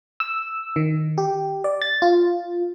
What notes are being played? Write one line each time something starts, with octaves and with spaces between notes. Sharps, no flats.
E6
D#3
G4
D5
A6
F4